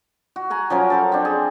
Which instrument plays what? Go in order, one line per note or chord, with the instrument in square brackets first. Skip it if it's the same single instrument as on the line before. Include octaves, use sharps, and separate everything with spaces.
[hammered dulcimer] F#4
F#5 G#5 A#5
F3 F#3 C#4 A#4
A4 C5 A5
C4 D4
G#4